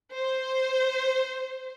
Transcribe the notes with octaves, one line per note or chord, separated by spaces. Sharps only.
C5